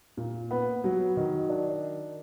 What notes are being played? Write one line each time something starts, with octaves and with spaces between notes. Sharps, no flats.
A#2
B3
F#3
D#3
D4